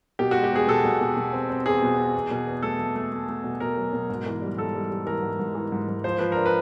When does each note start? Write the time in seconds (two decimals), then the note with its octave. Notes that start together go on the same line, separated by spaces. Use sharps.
0.19 B2 G4
0.31 G#3 F#4
0.43 G4
0.52 E2 G#4
0.68 B2 A4
0.85 B2
1.01 B2
1.16 B2
1.33 C4
1.50 C4
1.66 E2 G#4
1.82 B2
1.97 C4
2.15 E2
2.31 B2
2.47 E2
2.62 A3 A4
2.79 A3
2.96 A3
3.12 A3
3.29 A3
3.44 B2
3.60 B2 A#4
3.76 F#3
3.93 B2
4.09 G#2
4.26 E3
4.42 G3
4.58 G#2 A4
4.75 G3
4.91 G3
5.07 E3 A#4
5.23 G#2
5.39 G#2
5.55 E3
5.72 G#2
5.88 G#2
6.04 F3 C5
6.18 F3 B4
6.32 D4 A#4
6.46 B4